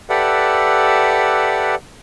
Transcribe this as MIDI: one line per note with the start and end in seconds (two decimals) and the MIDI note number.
0.10 1.75 67
0.10 1.75 69
0.10 1.75 71
0.10 1.75 74
0.10 1.75 76
0.10 1.75 78